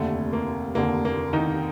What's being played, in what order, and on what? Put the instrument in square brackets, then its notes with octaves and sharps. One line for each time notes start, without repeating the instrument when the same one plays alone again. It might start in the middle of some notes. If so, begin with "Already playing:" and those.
Already playing: [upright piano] F1 D#2 D3 [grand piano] A3
[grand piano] A#3
[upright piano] F1 D#2 D3 [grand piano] A#3
[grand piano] A#3
D#3 D#4